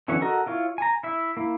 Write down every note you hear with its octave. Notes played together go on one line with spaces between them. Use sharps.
D3 E3 F#3 C#4 C#6
F#4 A4 A#4 D#5
E4 F4 C#5
G#5 A#5
E4 E5
A#3 E4